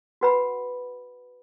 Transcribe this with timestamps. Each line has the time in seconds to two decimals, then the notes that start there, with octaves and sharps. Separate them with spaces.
0.21 F#4 B4 F#5 B5